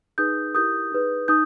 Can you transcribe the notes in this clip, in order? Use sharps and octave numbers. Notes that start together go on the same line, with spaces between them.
D#4 G#4 B4 D#6 G6
E4 G4 A#4 D#6 G6
D#4 G#4 B4
D#4 D#6 G6